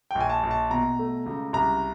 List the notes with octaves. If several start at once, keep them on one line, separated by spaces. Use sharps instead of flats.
G5
A#1
G#5
A5
A#1
A5
B2 A#5
A3
C#2
C2 A#5